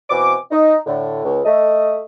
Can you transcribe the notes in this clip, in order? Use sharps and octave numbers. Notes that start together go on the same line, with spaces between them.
B2 E3 C4 G#5 D6
D#4
A2 D3
C#2
A3 D#5